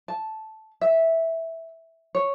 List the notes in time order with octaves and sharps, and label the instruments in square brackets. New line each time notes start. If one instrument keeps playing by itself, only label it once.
[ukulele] A5
E5
C#5